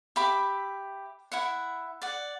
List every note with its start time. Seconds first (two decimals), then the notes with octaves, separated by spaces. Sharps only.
0.16 G4 E5 B5 D6
1.32 E4 E5 F#5
2.02 D5 F#5